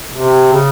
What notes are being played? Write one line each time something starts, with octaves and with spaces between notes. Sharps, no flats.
C3
C#3